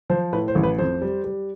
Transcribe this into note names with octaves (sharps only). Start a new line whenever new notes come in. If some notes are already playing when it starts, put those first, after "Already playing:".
F3 C5
A2 B4
C5
A1
B4
F2 C5
G3
G3